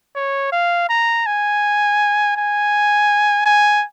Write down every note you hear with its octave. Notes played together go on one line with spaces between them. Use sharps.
C#5
F5
A#5
G#5
G#5
G#5